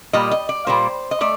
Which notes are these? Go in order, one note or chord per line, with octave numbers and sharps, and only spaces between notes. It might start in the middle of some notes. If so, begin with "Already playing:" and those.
A#2 G3 A#3 D#5
D#5
D5
A#2 G3 A#3 C5
D#5
A3 D5